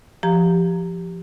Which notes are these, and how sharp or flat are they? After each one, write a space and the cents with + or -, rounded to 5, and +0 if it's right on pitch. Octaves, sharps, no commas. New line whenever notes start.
F3 -15 G4 +0 A#5 -15